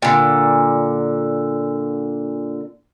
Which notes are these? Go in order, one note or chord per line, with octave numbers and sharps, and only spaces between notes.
A#2 D3